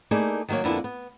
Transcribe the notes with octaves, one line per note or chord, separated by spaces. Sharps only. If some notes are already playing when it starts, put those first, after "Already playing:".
A3 A#3 D#4 E4 G#4 D5
D#3 F#3 A3 A#3 C#5
F2 D3 A#3 B3 D4 E4
B3